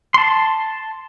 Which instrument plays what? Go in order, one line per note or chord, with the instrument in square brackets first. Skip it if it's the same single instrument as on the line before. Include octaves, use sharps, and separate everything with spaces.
[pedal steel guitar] A5 C6